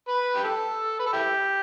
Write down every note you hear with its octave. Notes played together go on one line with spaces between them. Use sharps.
B4
G4
A4
B4
A4
E4 G4